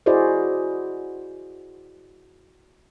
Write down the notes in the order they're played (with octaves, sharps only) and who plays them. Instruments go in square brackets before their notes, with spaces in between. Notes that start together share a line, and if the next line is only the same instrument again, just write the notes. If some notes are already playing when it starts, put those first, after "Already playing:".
[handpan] E4 F#4 G#4 C5 D5 D#5